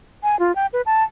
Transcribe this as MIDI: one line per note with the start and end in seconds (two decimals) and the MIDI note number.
0.23 0.38 80
0.39 0.54 65
0.55 0.67 79
0.73 0.82 71
0.86 1.03 81